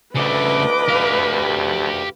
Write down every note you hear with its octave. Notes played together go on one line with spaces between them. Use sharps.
D2 C#3 A3 B4 D#5 D6
G4 F5